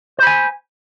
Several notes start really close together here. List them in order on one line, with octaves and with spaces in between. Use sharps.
C5 B5 G#5